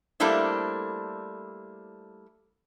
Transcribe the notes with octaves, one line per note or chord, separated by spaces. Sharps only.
G3 A3 A#3 D4 E4 C5